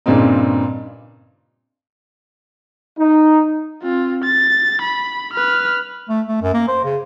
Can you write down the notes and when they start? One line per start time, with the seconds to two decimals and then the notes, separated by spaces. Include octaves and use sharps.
0.06 G2 A#2 C#3 C4 D#4
2.99 D#4
3.82 C4 F4
4.24 A6
4.82 B5
5.33 B4 F6
6.09 A3
6.28 A3
6.42 F#2
6.54 A#3
6.68 C5
6.84 C#3